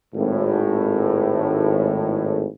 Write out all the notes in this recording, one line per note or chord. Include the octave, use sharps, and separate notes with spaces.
G#1 A2